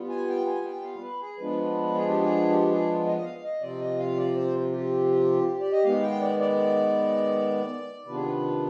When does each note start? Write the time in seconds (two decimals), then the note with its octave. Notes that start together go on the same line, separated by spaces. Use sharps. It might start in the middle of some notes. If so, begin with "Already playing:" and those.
Already playing: G3 B3 F4
0.09 G#5
0.28 G5
0.46 G#5
0.65 G5
0.83 F5
1.01 B4
1.20 G#4
1.38 F3 G#3 B3 D4 F4 B4
1.95 G#4
2.08 G4
2.22 G#4
2.50 G4
2.69 G#4
3.06 D#5
3.16 D#5
3.24 F5
3.43 D#5
3.61 C3 F3 C4 F4 D5
3.80 D#5
3.99 F5
4.16 D5
4.36 C5
4.72 G4
5.61 D5
5.72 D#5
5.84 D#3 G#3 B3 F5
6.02 G5
6.21 D5
6.40 D5
8.06 C3 D#3 B3 D4 F4 B4
8.16 G#4
8.25 B4